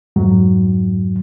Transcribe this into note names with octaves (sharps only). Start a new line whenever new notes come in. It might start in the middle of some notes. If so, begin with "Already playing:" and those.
F2 G#2 F#3